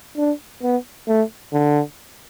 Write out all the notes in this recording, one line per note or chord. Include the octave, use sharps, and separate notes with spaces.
D4
B3
A3
D3